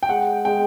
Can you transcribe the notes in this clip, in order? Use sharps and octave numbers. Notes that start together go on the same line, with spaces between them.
G5
G#3 F#5
G#3 G5